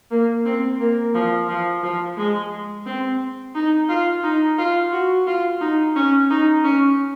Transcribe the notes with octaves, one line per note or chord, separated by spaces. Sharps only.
A#3
C4
A#3
F3
F3
F3
G#3
C4
D#4
F4
D#4
F4
F#4
F4
D#4
C#4
D#4
C#4